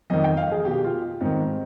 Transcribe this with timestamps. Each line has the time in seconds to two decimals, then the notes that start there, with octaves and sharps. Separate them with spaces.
0.10 F2 D#3 D#5
0.24 G5
0.37 F5
0.52 G#4
0.65 B2 G4
0.84 F4
1.21 G#2 D#3 C4